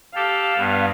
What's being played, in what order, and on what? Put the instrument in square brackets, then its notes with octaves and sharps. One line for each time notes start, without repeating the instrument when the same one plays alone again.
[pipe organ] G4 A4 [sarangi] F5
[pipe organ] G2 B3